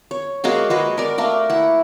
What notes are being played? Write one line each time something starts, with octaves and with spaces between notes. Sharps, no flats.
C#5
G#3 A#3 F#4 G#4
G#3 F#4 B4
A#4 D5
A3 A#3 A#4
E4 F#5